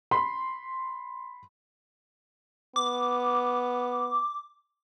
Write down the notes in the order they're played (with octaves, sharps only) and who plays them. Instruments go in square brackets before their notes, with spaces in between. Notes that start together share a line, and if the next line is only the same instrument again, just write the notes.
[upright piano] B5 C6
[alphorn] B3 [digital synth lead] D6